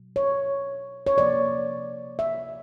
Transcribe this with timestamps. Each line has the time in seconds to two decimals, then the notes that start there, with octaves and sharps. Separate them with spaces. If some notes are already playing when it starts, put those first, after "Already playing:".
Already playing: B2 F#3
0.16 C#5
1.07 C#5
1.17 C3 F3 A#3 D5
2.19 E5